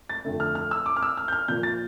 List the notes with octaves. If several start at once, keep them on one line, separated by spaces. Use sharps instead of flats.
A6
F2 D3 A3
F6
F6
E6
D6
F6
E6
F6
G6
F6
A#2 F3 A#3 G6
A6